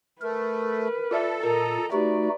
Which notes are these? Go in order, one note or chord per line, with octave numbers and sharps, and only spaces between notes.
A3 A#4 B4
F4 A4 D5 E5
A#2 A#4 D#5 A#5
A3 D#4 F#4 G4 B4 D5